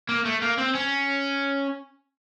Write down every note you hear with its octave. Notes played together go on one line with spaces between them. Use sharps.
A#3
A3
A#3
C4
C#4